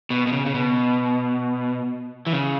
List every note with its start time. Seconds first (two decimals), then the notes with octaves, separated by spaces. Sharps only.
0.10 B2
0.27 B2
0.33 C#3
0.46 C#3
0.55 B2
2.27 E3
2.33 C#3